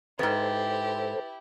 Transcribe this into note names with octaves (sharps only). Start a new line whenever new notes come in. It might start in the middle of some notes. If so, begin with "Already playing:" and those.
F2 G#2 E4 G4 A4 B4 C5 A6